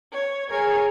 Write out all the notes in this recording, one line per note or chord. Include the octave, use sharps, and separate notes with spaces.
C#5
G#4 A#4 C#5 G#5